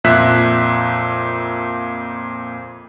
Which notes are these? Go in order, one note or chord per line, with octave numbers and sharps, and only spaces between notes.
F2 A#2 E5 F#6 B6